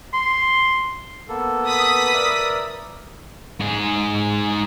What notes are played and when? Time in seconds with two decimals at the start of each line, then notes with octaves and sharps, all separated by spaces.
0.14 C6
1.29 A#3 B3 A4
1.66 B4 D#6 B6
2.14 A#4 D5 E5
3.60 G#2 G#4